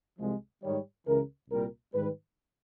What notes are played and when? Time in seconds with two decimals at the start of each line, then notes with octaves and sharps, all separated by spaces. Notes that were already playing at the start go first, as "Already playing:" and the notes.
0.18 C2 C3 F3 G#3
0.62 G#2 D#3 G3 C#5
1.06 C#2 C#3 E3 A#4
1.50 C2 A#2 G3 A#4
1.93 G#2 D#3 G3 B4